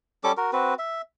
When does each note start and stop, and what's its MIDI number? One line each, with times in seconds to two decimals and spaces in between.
0.24 0.32 55
0.24 0.32 61
0.24 0.32 69
0.24 0.32 86
0.37 0.51 66
0.37 0.51 70
0.53 0.74 60
0.53 0.74 66
0.53 0.74 71
0.79 1.01 76